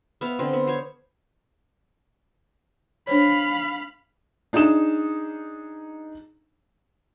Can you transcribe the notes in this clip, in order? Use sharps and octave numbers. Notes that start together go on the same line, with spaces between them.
B3 E5 F5
D3 C4
B3
C5 C#5
D4 C5 C#5 F5 B5
D4 D#4 G#4 D#6 E7